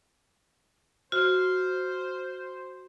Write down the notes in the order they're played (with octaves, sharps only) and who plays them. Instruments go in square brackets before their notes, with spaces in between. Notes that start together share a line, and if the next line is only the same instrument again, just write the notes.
[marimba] F#4 [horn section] C5 [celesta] F6